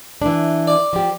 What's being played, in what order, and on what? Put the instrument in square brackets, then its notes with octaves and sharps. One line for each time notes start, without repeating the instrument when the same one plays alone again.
[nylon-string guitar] E3 D4
[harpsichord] D5
[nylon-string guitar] F3 G4